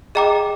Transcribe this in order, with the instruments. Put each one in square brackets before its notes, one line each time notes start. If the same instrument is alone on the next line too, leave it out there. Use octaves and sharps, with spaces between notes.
[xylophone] G#4 D#5 G5 A#5 D6